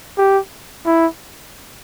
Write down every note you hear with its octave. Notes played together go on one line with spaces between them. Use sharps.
G4
E4